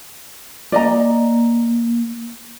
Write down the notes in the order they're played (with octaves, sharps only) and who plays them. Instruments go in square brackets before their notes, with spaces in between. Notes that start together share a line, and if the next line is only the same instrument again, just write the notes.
[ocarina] A#3 [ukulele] D5 D#5 A#5